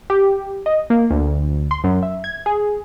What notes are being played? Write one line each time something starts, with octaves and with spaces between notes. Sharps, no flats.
G4
D#5
A#3
D2
C6
F#2
E5
G#6
G#4